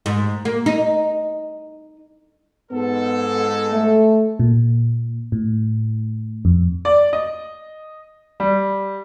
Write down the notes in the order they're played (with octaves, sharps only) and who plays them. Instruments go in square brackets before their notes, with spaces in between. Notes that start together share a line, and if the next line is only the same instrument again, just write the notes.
[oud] G#2
A#3
D#4
[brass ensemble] G#2 A4 [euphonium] B3
[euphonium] A3
[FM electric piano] A#2
A2
F2
[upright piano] D5
D#5
G3